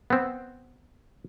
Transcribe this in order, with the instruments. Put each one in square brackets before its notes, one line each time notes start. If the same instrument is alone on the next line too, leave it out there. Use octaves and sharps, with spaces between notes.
[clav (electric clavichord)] B3 C4